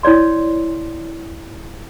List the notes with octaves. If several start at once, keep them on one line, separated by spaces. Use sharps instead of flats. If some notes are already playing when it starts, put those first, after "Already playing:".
E4 C#5 D5 C6